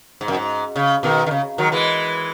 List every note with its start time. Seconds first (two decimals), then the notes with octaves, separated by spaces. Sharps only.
0.21 G#2
0.28 F#2
0.35 G#2
0.76 C#3
1.03 B2 D#3
1.26 D#3
1.31 C#3
1.58 D#3 F#3
1.72 E3 G#3